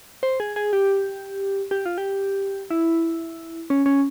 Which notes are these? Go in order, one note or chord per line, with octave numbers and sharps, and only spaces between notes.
C5
G#4
G#4
G4
G4
F4
G4
E4
C#4
C#4